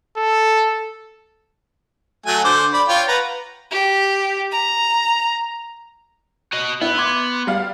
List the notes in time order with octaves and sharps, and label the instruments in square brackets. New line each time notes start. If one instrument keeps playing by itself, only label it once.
[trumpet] A4
[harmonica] F#3 A3 G#5
D3 C5 D6
D5 B5
F4 C#5 G5
B4 F#5 A#5
[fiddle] G4
A#5
[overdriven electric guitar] F#4 D#5
[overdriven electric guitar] B3 [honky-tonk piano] E4
[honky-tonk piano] C6 D6 G#6
G3 F5